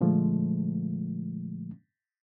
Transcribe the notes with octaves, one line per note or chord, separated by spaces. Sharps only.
A#2 D3 F3 G#3 A3